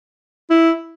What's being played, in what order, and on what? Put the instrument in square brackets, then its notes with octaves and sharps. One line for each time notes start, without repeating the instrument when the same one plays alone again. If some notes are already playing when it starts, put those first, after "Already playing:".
[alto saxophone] E4